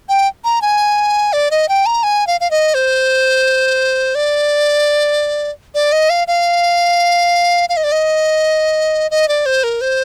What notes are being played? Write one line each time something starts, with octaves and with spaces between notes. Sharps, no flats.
G5
A#5
G#5
D5
D#5
G5
A#5
G#5
F5
F5
D#5
C5
D5
D5
D#5
F5
F5
F5
D#5
D5
D#5
D#5
D5
C5
A#4
C5